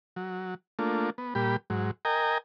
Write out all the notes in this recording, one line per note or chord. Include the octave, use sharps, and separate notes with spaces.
F#3
A3 A#3 D4 F4
B3
A#2 G3 G4 B5
G#2 F#3
A#4 D#5 G5 G#5 A#5